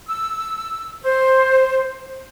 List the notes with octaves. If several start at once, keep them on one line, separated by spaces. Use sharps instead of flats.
E6
C5